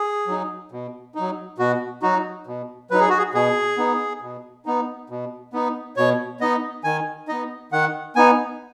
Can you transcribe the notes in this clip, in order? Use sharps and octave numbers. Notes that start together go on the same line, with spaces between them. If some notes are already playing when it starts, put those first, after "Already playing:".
Already playing: G#4
F#3 D#4
B2
F#3 D#4
B2 F#4
F#3 D#4 F#4
B2
F#3 D#4 B4
G#4
F#4
G#4
B2 G#4
B3 D#4
B2
B3 D#4
B2
B3 D#4
B2 C#5
B3 D#4 D#5
D#3 G#5
B3 D#4 D#5
D#3 F#5
B3 D#4 G#5